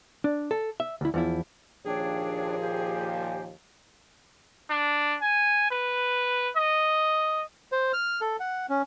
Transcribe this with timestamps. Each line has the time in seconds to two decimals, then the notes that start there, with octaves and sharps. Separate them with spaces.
0.24 D4
0.51 A4
0.80 E5
1.01 D2 E4
1.14 E2 F3 E4
1.86 D#2 A#2 F3 D4 G#4 C#5 G5
2.61 G4 F5 G#5
4.70 D4
5.22 G#5
5.71 B4
6.56 D#5
7.72 C5
7.93 F6
8.21 A4
8.40 F#5
8.70 C#4